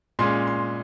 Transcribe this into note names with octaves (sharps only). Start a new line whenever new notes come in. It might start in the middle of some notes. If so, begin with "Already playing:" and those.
A#2 G#3 C#4 C6
C6